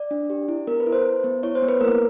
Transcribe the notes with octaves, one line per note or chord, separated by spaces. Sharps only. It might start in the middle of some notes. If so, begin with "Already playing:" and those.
Already playing: D5
D4
G4
E4
B3 A#4
B4
E4
C5
E4
B3
E4 C#5
C5
B3
B4
A#3 A#4